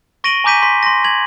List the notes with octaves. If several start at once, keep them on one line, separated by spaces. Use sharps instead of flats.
C#6 A#6 D7 D#7 F#7 G7
G#5 A#5 D6 G6 B6 D#7
C6 B6
C6 A#6
G#6 F#7